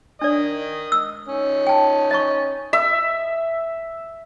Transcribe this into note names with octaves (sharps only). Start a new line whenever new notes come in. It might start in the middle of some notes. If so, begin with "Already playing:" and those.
D4 A#4 D5 D#5
E6
C#4 D#4
G5 A5
D#5 A#5 C#6
E5